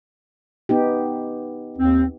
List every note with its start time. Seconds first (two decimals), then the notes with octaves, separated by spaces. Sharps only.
0.69 B3 D#4 G4
1.78 D#2 C4